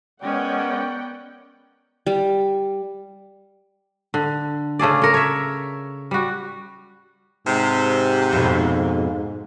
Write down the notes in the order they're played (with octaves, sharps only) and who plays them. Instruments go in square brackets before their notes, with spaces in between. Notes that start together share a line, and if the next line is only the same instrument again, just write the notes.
[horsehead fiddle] G#3 C#4 [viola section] B3 F#5 G5 [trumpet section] A#4 C#5 D5
[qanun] G3
[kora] D3
C#3 A3 G#4 D5
A4 A#4
C#5 E5
G3 F#4
[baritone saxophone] G#2 [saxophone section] C3
[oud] F2 B2